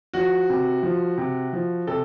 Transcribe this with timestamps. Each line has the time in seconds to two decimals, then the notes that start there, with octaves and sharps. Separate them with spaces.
0.13 F3 F#4
0.49 C3
0.83 F3
1.18 C3
1.53 F3
1.87 C3 A4